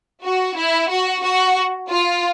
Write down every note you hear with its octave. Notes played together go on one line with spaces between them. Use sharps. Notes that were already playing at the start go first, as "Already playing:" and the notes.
F#4
E4
F#4
F#4
F4